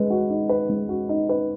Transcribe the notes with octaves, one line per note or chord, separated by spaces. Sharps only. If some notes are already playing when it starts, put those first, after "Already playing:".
Already playing: G#3 B4
F#4
D#4
B4
G#3
F#4
D#4
B4